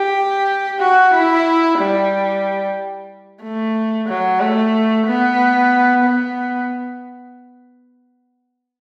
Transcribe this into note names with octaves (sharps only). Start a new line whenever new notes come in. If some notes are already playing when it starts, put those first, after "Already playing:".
Already playing: G4
F#4
E4
G3
A3
F#3
A3
B3
B3